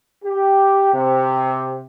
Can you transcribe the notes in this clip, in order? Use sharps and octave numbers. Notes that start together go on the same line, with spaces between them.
G4
C3